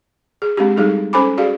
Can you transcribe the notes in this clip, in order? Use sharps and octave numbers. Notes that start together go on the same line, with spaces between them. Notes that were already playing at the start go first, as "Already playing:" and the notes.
G#4
G#3 C4 D4 G4
G3 D#4 G#4 A4
C#4 A4 C5 G#5 B5 D6
F#4 G#4 D5 F5